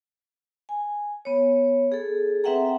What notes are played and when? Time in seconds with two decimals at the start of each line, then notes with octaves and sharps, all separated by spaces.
0.69 G#5
1.25 B3 C#5
1.92 G#4 A4
2.44 C4 B4 E5 F#5 G5 A#5